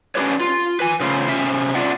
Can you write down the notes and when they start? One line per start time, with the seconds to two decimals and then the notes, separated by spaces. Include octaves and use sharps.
0.15 C#4 D4 E4 G4 B4 C#5
0.40 F4
0.80 B4 G#5
1.00 C#3 A3 F4 C5
1.29 C3 C#4 E5
1.75 D4 F4 D5 E5 F#5